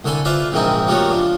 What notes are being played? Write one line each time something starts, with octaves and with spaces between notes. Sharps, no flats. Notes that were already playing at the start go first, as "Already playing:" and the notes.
C2 D3 A4 G#5 B5
F4 B4 C5 D5 E5 F5
A#1 G#2 D#3 E3 C4 D#4
F3 G3 A3 A#3 C#4 F#4
F3 D4